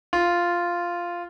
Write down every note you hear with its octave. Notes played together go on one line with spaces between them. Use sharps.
F4